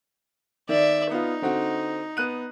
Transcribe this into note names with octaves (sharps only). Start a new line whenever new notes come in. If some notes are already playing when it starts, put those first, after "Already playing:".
D#3 D5 E5
B3 D#4 F4
D3 C4 F#4
B3 F#6 D#7